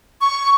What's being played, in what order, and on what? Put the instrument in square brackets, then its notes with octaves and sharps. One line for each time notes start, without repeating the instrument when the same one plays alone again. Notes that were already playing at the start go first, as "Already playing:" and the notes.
[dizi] C#6